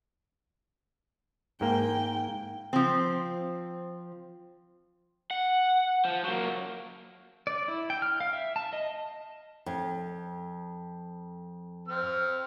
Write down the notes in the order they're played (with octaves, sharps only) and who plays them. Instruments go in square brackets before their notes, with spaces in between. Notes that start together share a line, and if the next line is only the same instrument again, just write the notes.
[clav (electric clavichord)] G#2 A#3 [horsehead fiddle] G5
[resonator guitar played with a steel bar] F3 C4
[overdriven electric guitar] F#5
F3
F#3 A#3
[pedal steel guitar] D5
E4
G5
F6
F5
E5
A5
D#5
[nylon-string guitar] F2
[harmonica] C4 F6